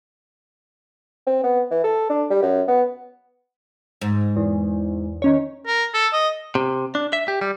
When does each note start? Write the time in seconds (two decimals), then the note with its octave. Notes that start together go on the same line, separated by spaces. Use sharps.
1.27 C4
1.44 B3
1.71 E3
1.84 A4
2.09 D4
2.30 G3
2.42 F#2
2.68 B3
4.01 G#2
4.36 E2
5.22 D#3 C#4 C#5
5.67 A#4
5.94 A4
6.13 D#5
6.55 C3
6.95 D4
7.13 E5
7.28 G4
7.41 G3